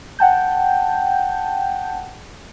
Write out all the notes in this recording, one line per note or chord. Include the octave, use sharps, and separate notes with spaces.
F#5 G5 A5 G6